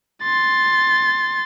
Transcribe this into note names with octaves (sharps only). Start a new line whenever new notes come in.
C6 A6